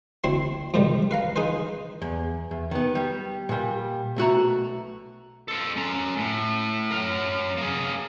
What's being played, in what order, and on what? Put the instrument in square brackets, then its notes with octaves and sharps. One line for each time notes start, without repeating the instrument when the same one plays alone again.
[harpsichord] D2 C4 E4 C6
F2 G#2 C3 D#3 G3
B4 F5 A#5
D#4 G#4 B4 C5
[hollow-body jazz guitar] E2
E2
D#3 B3
G3
A#2 G3
B1 A3 F#4 A#5
[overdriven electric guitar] A4 C5
C#4 A#5
A2
F#3 A#4
A#3 G#4